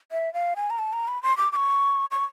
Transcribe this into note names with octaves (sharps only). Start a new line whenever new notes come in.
E5
F5
G#5
A#5
A5
A#5
B5
C6
D6
D6
C#6
C#6